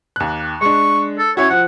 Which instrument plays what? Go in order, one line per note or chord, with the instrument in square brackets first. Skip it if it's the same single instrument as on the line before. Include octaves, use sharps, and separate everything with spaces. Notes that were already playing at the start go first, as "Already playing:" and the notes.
[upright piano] D#2 F#6
[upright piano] G#3 D4 [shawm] C#6
[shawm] A4
[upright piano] C#4 E4 F#4 [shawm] C#5
[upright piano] F3 [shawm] F#5